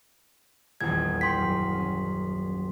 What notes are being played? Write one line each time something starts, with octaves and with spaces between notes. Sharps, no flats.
D#1 A#1 E2 G#6
G5 C6 B6
F#2
C#4